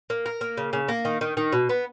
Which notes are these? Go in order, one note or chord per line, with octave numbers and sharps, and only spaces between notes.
A#3
A#4
A#3
C#3
C#3
A#3
D#3
D#3
D#3
B2
B3